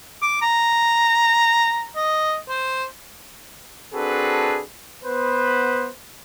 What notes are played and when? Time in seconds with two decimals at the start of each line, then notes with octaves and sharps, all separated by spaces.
0.22 D6
0.42 A#5
1.96 D#5
2.49 C5
3.94 C4 D4 F#4 G#4 A4 B4
5.04 B3 B4 C5